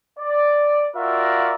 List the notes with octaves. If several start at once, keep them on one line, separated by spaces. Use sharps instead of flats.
D5
F4 F#4 A#4 D5 E5 F5